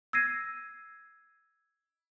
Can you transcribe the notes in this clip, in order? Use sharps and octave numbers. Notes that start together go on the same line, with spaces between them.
E6 G#6 A#6 C7 D#7